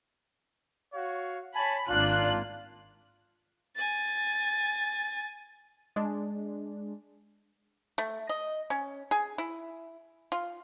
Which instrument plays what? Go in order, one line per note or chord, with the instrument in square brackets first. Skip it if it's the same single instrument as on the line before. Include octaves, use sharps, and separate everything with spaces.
[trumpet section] F#4 C#5 F5
[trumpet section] C#5 G#5 A5 [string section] B5
[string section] G#1 D4 F#6 [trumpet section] A#3 F4
[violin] G#5 A6
[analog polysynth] G#3 D4
[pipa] A3
D#5
C#4
G#4
E4
F4